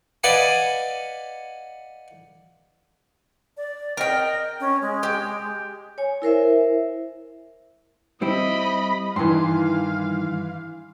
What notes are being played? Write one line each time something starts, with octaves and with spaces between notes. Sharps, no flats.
B4 D5 D#5 F5 F#5 G#5
D5
A#4 D#5 G5
C#4
G#3
G4
C#5 G#5
E4 A#4 C5 E5
G3 C4 E4 D#5 B5
G2 D#3 E3 F5 C6